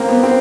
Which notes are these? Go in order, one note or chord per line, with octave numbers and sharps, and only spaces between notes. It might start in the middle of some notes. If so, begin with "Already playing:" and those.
Already playing: A#3 C4
B3
C4